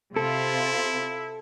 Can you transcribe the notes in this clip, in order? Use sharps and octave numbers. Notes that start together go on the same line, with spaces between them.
C3 E4 F4 A4